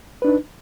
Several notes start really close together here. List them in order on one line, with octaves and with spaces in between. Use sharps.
B4 D4 D#4